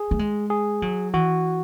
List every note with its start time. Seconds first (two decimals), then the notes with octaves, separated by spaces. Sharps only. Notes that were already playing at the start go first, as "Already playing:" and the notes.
Already playing: G#4
0.11 A3
0.19 G#3
0.50 G#4
0.82 F#3
1.14 E3 F#4